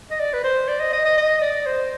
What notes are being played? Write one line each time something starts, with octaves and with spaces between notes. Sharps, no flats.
D#5
D5
B4
C5
D5
D#5
D#5
D#5
D#5
D5
C5